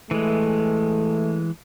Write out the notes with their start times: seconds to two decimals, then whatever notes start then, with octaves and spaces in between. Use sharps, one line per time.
0.11 E3 G#3 A3